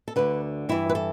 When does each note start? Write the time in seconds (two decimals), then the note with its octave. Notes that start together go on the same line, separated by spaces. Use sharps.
0.08 A4
0.16 D2 D3 B4
0.69 G2 E3 E4
0.89 B4
0.95 A4